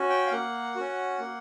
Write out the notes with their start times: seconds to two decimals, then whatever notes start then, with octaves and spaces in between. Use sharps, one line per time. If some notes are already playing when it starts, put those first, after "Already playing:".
Already playing: C#4 F#4
0.10 G5
0.26 F5
0.32 A#3 F#5
0.76 C#4 F#4
1.19 A#3